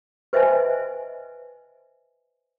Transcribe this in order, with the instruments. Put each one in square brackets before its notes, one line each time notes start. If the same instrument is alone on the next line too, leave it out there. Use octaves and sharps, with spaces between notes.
[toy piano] B4 C5 D#5 E5 G#5 A5